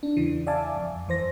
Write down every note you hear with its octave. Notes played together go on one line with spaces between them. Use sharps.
D4
E2 C#3 E3
D5 E5 F5 G#5 A5 D6
F2
G#1 F2 E3 C5 A#6